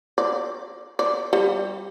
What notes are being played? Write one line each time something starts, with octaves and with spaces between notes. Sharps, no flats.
D5
D5
G3